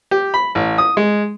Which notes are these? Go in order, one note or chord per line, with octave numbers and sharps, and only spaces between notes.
G4
B5
A1
D#6
G#3